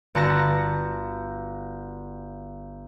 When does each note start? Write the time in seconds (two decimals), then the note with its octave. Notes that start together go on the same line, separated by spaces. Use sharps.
0.15 G1 F#4 A5 A#6